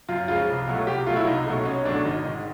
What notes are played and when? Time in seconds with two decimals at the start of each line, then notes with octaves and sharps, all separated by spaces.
0.08 F#2 F4
0.28 C#3 F3 G#3 F4
0.48 C2
0.67 B2 F#3 A3
0.87 C2 G4
1.07 B2 F#3 A3 F4
1.16 E4
1.27 C2 D#4
1.46 B2 F#3 A3
1.65 C2 C#4
1.85 B2 F#3 A3 D4
2.04 G#1 D#4
2.24 G#2 D#3